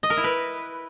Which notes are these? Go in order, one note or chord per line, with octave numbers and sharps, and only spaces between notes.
D#5
A#4
E4
B4